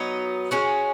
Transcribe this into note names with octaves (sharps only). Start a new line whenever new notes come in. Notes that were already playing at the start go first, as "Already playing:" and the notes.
Already playing: F#3 B3 D#4
G#3 C#4 F#4